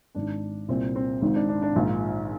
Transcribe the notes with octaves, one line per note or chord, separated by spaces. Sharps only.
G#1 G#2 D#3 D4
C2 A#2 C4
C4
G#1 G#2 D#3 C4
D4
D4
D4
A#1 G#2 D#3 F4